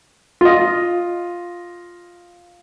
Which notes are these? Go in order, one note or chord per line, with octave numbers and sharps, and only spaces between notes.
F4 D#5